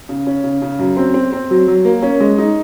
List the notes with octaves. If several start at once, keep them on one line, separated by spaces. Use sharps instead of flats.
C#3
C#4
C#3
C#3
F#2
C4
C4
C4
F#3
F#3
A#3
C#4
G#3
D#4